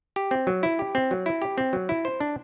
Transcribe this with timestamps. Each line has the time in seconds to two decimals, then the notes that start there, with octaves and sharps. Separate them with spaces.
0.16 G4
0.31 C4
0.47 F#3
0.63 E4
0.79 G4
0.95 C4
1.11 F#3
1.26 E4
1.42 G4
1.58 C4
1.73 F#3
1.89 E4
2.05 C5
2.20 D4